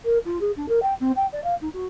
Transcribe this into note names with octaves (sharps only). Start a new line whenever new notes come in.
A#4
F4
G#4
D4
A#4
G5
C4
G5
D5
F5
D#4
F#4